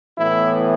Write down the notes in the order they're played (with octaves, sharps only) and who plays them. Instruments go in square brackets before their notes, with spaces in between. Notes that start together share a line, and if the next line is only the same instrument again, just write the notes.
[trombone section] A2 E3 B3 E4